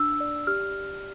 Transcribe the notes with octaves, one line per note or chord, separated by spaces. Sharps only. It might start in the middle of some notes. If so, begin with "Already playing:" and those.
Already playing: D4 E6
D5
G4 F6